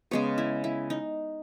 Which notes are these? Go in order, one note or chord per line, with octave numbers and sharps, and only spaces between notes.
C#3 G#3 B3 C#5
E4
E4
D#4